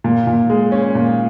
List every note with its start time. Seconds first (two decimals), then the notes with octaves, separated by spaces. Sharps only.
0.04 A#2
0.27 A#2
0.50 G#3
0.72 C#4
0.95 A#2